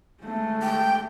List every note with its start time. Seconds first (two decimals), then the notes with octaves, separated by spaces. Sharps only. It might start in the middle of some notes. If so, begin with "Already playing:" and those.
0.24 G#3 A3
0.62 G5